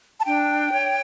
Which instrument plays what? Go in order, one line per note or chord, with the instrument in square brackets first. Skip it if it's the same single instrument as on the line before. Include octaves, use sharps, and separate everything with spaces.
[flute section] A5
D4 G5
C#5